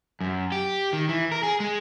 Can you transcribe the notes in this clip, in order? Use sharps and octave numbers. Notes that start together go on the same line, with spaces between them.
F#2
G4
D#3
E3
A#4
G#4
G#3